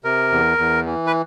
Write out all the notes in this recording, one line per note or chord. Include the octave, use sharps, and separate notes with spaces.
C3 A#4
E2
E2
E3
B4